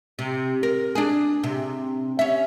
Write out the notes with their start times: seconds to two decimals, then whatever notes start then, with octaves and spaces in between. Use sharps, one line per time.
0.19 C3
0.63 A#4
0.95 D4 G#4
1.43 C3
2.19 C#4 E5